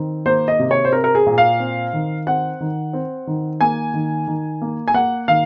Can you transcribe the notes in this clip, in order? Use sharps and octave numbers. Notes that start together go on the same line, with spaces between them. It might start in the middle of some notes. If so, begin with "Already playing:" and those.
Already playing: D#3 C4
A#3 C5
D#5
C3
C#5
C5
C4 A#4
A#4
G#4
A#2
F5
C4
D#3
C4 F#5
D#3
C4
D#3
A#3 G#5
D#3
D#3
A#3
G#5
A#3 F#5
D#3 F5